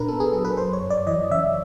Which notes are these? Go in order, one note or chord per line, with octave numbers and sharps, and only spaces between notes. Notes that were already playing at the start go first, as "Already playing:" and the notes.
Already playing: A#2 D4 A#4 B4
B3 A4
G#4
F#3 A4
B4
F#2 C5
C#5
F#2
D5
E3 D#5
C#3 E5